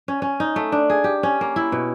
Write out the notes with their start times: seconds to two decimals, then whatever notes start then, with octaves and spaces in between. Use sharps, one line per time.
0.08 C#4
0.22 C#4
0.40 D#4
0.56 A3
0.72 D4
0.90 G#4
1.04 G4
1.23 C#4
1.41 A#3
1.56 E4
1.72 B2